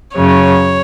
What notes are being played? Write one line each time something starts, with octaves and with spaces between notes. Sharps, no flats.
F#2 C#3 C#5